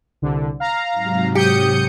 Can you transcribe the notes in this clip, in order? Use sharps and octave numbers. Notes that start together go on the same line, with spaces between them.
C2 D3
F5 A#5
G#2 C3 F#3
G4 D#6 G6 C#7